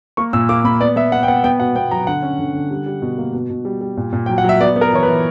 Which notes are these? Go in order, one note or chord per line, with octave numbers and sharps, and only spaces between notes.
A#3 C#6
A#2 E6
A#3 D6
A#2 B5
B3 D5
B3 E5
B3 F#5
G5
B3 F#5
B3 G5
B2 F#5
B3 G5
F#3 A#5
D3 F#5
C#4
D3
D3
G3
G3
B2
A#3
B2
B2
G3
G3
A#2
A#2
F#3 G5
F#5
F#3 E5
B3 D5
B3
A#4
E3 C#5
B4
E3